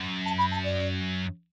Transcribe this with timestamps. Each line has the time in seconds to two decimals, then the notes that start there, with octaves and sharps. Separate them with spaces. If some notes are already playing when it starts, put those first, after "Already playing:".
Already playing: F#2
0.25 A5
0.38 B5
0.51 A5
0.64 D5